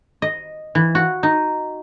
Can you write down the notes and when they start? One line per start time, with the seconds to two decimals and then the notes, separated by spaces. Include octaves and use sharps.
0.22 D#5
0.75 E3
0.95 F#4
1.23 D#4